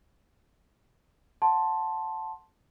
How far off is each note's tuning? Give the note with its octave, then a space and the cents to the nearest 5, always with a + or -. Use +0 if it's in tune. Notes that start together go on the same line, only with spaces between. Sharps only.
F#5 -10 A5 +0 C6 +10